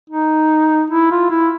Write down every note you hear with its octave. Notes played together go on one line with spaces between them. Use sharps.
D#4
E4
F4
E4